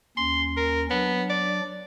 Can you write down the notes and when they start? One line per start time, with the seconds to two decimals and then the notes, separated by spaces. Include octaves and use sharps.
0.17 D#2 C#4 C6
0.57 A#4
0.91 F#3 B3 D4
1.30 D5